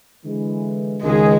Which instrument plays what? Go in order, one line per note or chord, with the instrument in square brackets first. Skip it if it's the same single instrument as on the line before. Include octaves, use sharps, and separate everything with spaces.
[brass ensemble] D3 E3 G#3
[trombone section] C#2 D#3 [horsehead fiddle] G#3 G#4